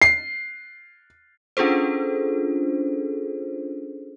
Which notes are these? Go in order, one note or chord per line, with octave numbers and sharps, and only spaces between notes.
C7
C#4 D4 F4 G#4 A4 C5